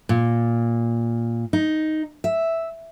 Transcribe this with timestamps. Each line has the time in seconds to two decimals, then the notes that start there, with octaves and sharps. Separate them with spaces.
0.09 A#2
1.53 D#4
2.24 E5